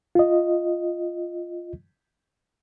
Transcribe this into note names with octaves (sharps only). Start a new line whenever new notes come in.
F4 D#5